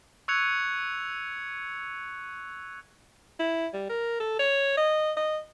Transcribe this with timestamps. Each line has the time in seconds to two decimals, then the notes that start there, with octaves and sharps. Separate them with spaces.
0.28 C#6 E6 F#6 G#6 C#7 F7
3.40 E4
3.74 G3
3.90 A#4
4.20 A4
4.39 C#5
4.77 D#5
5.17 D#5